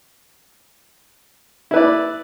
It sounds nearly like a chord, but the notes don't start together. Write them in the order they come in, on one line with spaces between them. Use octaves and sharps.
E4 B4 D5